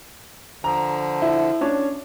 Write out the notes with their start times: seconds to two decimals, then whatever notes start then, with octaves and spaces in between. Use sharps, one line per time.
0.64 D3 F3 A#5
1.22 E4
1.61 C#4 D4 C#5